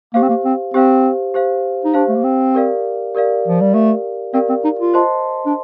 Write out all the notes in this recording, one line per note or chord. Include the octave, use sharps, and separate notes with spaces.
A#3 G4 C5 F5
C4
A#3
C4
C4 G4 C5 F5
G4 C5 F5
D#4
D4 G4 C5 F5
A3
A#3
C4
G4 A#4 D5 F5
G4 A#4 D5 F5
F3
G3
A3 G4 A#4 D5 F5
C4 G4 A#4 D5 F5
C4
D#4
F4
C5 D#5 A5 C6
D4